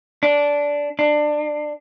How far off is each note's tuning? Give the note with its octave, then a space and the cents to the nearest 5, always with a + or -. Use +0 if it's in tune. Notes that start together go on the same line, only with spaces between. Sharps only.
D4 -15
D4 +20